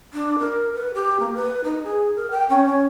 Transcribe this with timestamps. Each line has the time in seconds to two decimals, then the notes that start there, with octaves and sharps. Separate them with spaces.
0.13 D4
0.39 A#4
0.74 B4
0.94 G4
1.20 A#3
1.35 B4
1.64 D#4
1.83 G#4
2.16 A#4
2.31 G5
2.50 C#4
2.65 C#4